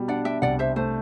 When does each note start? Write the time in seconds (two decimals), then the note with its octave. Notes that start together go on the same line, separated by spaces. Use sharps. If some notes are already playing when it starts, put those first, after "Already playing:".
Already playing: B2 G3
0.08 D4 D5 F#5
0.25 E5 G5
0.42 C2 D5 F#5
0.59 C5 E5
0.76 A3 C5